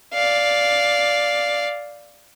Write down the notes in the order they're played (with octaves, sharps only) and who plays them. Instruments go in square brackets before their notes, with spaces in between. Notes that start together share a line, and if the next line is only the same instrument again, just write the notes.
[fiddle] D5 F5